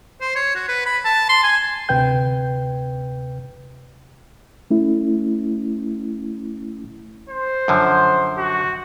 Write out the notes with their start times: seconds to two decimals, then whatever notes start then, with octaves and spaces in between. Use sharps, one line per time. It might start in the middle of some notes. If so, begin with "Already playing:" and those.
0.21 C5
0.36 C#5
0.55 F#4
0.68 B4
0.86 B5
1.05 A5
1.29 C6
1.43 G#5
1.89 D2 C3 B4 G5 G6
4.71 A3 C#4 E4
7.29 C5
7.68 F#2 D3 F3
8.38 F#4